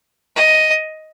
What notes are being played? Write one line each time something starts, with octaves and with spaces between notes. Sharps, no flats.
D#5